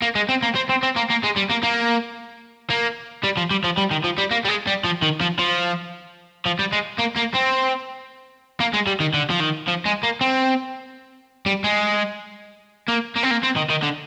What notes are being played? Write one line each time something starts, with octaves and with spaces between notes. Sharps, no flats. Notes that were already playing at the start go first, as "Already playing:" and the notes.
A#3
G#3
C4
A#3
C4
C4
C4
A#3
A#3
G#3
G3
A#3
A#3
A#3
G3
F3
G3
F3
G3
D#3
F3
G3
A#3
G3
G#3
G3
F3
D#3
F3
F3
F3
G3
G#3
A#3
A#3
C4
A#3
G#3
G3
D#3
D3
F3
D#3
F3
G#3
A#3
C4
G3
G#3
A#3
A#3
C4
A#3
C4
D#3
D#3
D3